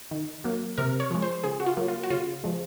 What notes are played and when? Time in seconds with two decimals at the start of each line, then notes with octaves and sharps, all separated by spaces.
0.11 D#3
0.44 F#3 A#3
0.78 C3 A#4
1.00 C#5
1.10 F3 G#3
1.22 C5
1.44 C#3 G#4
1.60 F#4
1.66 F4
1.77 F#3 A#3
1.88 F4
2.03 F#4
2.10 C#3 F4
2.44 F3 G#3